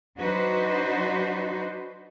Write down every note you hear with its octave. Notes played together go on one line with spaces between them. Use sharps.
F#3 D4 D#4 F#4 B4 C5